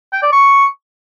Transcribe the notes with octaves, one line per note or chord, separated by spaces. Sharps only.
G5
D5
C#6